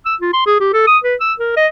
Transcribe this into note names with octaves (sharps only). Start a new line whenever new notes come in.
E6
F4
C6
G#4
G4
A4
D#6
B4
E6
A#4
D#5